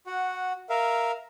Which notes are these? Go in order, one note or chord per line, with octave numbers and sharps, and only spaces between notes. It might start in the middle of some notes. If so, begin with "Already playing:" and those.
F#4 F#5
A#4 E5 F5